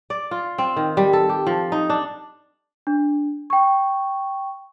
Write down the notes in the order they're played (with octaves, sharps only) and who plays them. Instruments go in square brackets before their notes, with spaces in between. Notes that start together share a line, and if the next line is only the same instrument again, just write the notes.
[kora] D5
F4
C4
D#3
G3
A4
G4
F3
D#4
D4
[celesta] D4
G5 C#6